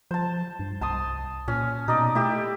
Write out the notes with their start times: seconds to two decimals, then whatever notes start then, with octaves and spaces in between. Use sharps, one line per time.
0.11 F3 C5 A5
0.59 G2
0.81 C2 A5 C6 D#6
1.48 A#2 C#4
1.88 B2 D#4 D5 D#5
2.15 A3 E4 G4